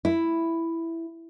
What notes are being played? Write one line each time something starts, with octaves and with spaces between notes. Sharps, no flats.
E4